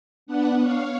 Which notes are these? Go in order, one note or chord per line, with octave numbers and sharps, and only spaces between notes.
B3 D4 F#5
C#5 F5